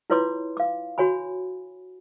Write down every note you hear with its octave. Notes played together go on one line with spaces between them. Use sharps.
E4 F4 B4 C#5 C6 D6
F5 D6
F#4 C#5 G#5 B5